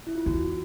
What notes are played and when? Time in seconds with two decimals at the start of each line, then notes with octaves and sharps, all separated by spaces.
0.07 E4
0.15 F4
0.26 E2 F#4